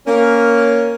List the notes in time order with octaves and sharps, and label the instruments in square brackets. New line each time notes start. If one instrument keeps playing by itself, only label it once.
[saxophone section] A#3 C#4